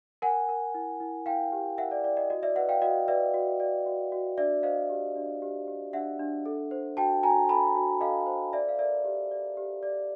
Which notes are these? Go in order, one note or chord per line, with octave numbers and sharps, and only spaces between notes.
A#4 F#5 G#5
A#4
E4
E4
E4 F5 G5
G4
A#4 E5 F#5
D5
E4 D5
D#5
F#4 D#5
D5 E5
B4 E5 F#5
F5 G5
F#4 D#5 F5
B4 D5 E5
F#4
D5
F#4
F#4
D4 D5 E5
C5 D#5 F5
G4
D4
G4
G4
D4 E5 F#5
D4
A4
C5
F#4 G5 A5
F#4 G#5 A#5
A4 A5 B5
F#4
A4 D#5 F5
C5
D5 E5
F5
A#4 D5 E5
G4
D5
G4
D5